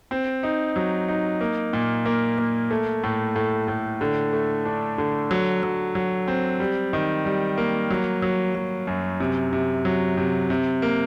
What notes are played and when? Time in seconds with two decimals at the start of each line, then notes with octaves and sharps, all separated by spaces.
0.11 C4
0.43 D#4
0.76 F#3
1.09 D#4
1.41 A#3
1.73 A#2
2.06 A#3
2.38 A#3
2.71 A3
3.04 A2
3.36 A2
3.68 A2
4.01 D3
4.33 A3
4.65 D4
4.98 D3
5.31 F#3
5.63 F#3
5.95 F#3
6.28 C4
6.60 G3
6.93 D#3
7.25 G3
7.58 A#3
7.90 F#3
8.22 F#3
8.55 F#3
8.87 F#2
9.20 C3
9.53 C3
9.85 F#3
10.18 C3
10.50 C3
10.82 A#3